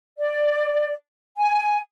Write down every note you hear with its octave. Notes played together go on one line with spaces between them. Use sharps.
D5
G#5